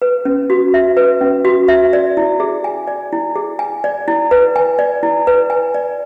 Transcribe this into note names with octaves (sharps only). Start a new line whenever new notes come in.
B4
C#4
F#4
E5
B4
C#4
F#4
E5
D5
E4
G#4
G#5
D5
E4
G#4
G#5
D5
E4
B4
G#5
D5
E4
B4
G#5
D5